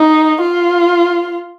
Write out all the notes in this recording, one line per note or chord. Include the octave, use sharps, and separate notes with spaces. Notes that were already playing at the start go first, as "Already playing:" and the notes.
Already playing: D#4
F4